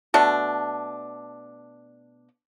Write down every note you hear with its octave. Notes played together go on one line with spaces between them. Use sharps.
B2 A3 D4